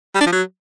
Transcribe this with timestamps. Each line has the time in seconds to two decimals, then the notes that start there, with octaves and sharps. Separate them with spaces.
0.15 G3
0.21 D4
0.27 F3
0.32 F#3